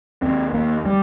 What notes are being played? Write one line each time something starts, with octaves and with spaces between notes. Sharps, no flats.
D#2 C4
D#2 A#3
G3